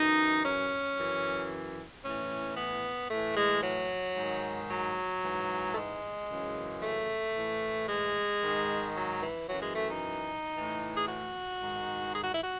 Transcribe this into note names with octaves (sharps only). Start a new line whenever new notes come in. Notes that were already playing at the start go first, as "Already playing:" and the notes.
Already playing: F#2 E3 D#4
C#4
F#2 E3
A2 E3 C#4
B3
A2 E3 A3
G#3
F#3
G#2 D#3
F#3
G#2 E3
A3
G#3
F#2 C#3 E3
A3
A2 E3
G#3
G#2 D#3
F#3
E3
F#2 E3 F#3
G#3
A3
D#4
A2 E3
G#4
F#4
G#2 D#3
G#4
F#4
E4
F#4